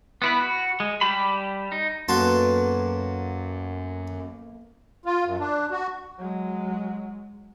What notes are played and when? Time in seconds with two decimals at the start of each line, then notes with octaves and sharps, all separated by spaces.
0.22 B3 E4 B4
0.41 F#4
0.80 G#3
1.01 G3 G4 A5 B5
1.72 D#4
2.08 F#2 A#3 B3 F#4 A4 A5 C6
5.05 F4
5.25 F#2
5.39 D4
5.71 F#4
6.18 F#3 G#3